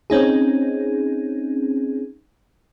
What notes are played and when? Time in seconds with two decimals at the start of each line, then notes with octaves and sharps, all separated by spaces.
0.10 C4 C#4 D#4 G#4